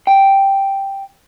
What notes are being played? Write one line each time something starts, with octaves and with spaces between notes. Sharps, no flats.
G5